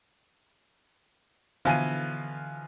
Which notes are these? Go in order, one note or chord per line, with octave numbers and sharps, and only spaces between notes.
B2 D3 E3 F3 E4 F5 G#5 D#7